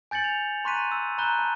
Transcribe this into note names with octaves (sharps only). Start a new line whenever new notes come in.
G#5 G6 A6 C#7 F#7
F7
A#5 C6 C#6 F#6 B6 D#7
E6
A#5 B5 E6 F#6 G6 G7
A5